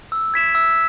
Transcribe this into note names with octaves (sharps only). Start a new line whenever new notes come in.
E6
G#6 B6 E7
E6